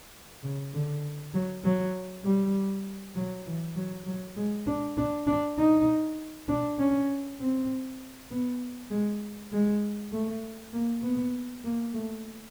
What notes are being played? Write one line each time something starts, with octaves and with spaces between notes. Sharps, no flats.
C#3
D3
F#3
F#3
G3
F#3
E3
F#3
F#3
G#3
D4
D4
D4
D#4
D4
C#4
C4
B3
G#3
G#3
A3
A#3
B3
A#3
A3